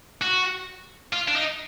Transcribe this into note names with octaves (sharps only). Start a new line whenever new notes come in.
F#4
F4
D4
D#4